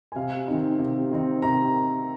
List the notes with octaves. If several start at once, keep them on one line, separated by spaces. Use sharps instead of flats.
G#5
C3 F5
D#3 C4 D#4
C3
D#3 C4 D#4
C3 A#5